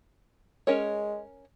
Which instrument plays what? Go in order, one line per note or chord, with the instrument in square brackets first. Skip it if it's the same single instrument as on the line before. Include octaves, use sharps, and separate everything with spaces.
[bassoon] G#3 [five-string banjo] C#4 A#4 C#5